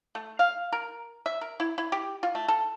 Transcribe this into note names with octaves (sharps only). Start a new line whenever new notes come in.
A3
F5
A#4
E5
A#4
E4
E4
G4
F4
A3
A4